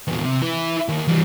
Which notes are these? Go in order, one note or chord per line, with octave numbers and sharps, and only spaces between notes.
E2 A#2
C3
E4 B4
D#2
E3 G3